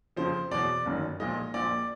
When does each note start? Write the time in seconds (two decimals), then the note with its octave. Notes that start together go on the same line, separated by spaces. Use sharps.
0.16 F2 C#3 F3 C5
0.51 E2 B2 F#3 D5
0.86 G1 F#2 D#3
1.20 B1 A#2 F3 G#3 D#5
1.54 A#1 A#2 F3 D5